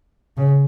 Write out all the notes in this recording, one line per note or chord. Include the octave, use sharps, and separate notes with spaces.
C#3